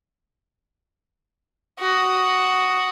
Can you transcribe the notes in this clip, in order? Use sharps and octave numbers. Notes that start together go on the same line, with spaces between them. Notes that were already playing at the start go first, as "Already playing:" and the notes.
F#4 D#6